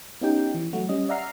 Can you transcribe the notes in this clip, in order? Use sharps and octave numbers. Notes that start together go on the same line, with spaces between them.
B3 C#4 D#4 G4 G5
E3
F#3 A3 F#4
G3 C#4 D#5
D5 E5 F#5 A#5 F6 C7